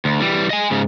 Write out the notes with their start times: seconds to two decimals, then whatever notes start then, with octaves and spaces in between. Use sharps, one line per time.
0.05 D2
0.20 E3 G3
0.50 D#5 G#5
0.71 G#2 C#3